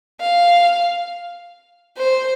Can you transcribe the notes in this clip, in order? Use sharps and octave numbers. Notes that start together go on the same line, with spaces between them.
F5
C5